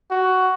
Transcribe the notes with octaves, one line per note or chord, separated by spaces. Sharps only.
F#4